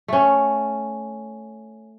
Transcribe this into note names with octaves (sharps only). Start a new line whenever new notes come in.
A3 C#4